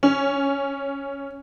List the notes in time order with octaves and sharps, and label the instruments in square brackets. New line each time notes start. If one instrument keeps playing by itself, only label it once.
[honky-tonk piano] C#4